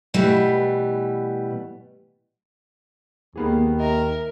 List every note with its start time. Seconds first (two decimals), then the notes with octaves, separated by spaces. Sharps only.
0.14 B2 E3 G3 A3
3.36 D#2 D#3 A#3 B3 G#4
3.80 A#4 D#5 E5